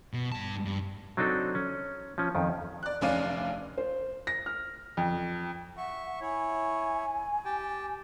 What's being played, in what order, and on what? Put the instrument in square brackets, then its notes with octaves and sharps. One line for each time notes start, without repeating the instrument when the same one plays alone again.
[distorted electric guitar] B2
G2 A5
G2
[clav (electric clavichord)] F#3 C4 D4 D#4 A4
C#4
F3 C#4
F2 D#3
[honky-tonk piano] D5 F#6
F1 D2 C#4 D5 F5 D#7
[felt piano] C5
A#6
F6
[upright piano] F2
[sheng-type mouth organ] E5 C#6 [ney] F#5
[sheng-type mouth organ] E4 C#5 [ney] G#5
[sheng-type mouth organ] G4 G5 A5